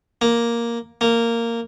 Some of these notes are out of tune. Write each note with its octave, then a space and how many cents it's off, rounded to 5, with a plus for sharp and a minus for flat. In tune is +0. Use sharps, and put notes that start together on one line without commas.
A#3 +5
A#3 -10